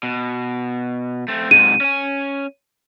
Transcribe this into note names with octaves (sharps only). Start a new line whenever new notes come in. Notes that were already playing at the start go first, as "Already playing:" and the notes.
B2
A3 C4
G#2 C3 D#7
C#4 G#5